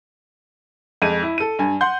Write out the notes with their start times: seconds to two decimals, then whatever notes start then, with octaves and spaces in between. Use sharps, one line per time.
1.02 F2 G#3 D#7
1.23 E4
1.38 A4 D#7
1.59 G2 G#5
1.81 F#5 C6 G6